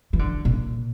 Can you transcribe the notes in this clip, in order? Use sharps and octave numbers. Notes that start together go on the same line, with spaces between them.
E3
D3
A#2